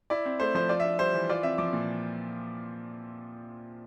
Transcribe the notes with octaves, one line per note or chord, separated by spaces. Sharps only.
E4 D5
C4
A3 C5
F3 C5
F4 D5
D4 E5
G3 C5
E3
F4 D5
C4 E5
F3 D6
A#2